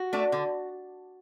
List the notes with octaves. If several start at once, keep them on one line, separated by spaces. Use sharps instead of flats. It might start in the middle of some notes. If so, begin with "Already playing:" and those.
Already playing: F#4
A3 D4
D3